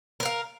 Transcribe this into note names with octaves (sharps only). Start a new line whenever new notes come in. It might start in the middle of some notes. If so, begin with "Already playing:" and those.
A#4 B4 F5